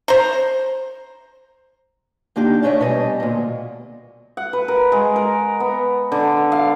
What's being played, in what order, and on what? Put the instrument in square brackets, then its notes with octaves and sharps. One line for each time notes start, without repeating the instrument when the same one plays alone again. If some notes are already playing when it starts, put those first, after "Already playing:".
[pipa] C5 A#5
[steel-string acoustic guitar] D3 A#3 D4 D#4 G4
G#2 A3 D4 C#5 D#5 E5
B2 G3 D#5 G#5
D2 A#2
[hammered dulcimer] F#5
B4
A#4
G#3
A#4
B3
D3
F5